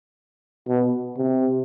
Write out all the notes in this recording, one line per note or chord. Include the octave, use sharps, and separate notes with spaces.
B2
C3